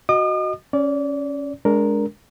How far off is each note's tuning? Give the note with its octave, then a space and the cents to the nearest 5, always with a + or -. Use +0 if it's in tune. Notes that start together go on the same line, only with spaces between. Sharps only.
F#4 +0 D#5 +0 D#6 -45
C#4 +0 D5 -25
G#3 +10 D4 -25 A#4 +0